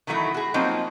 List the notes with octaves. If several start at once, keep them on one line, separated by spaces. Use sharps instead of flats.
D#3 E3 F#3 A3 E4
F#4 G#4
F3 F#3 A#3 C4 D#4